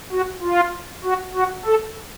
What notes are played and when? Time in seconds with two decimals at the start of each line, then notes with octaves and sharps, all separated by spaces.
0.12 F#4
0.43 F4
1.05 F#4
1.35 F#4
1.65 A4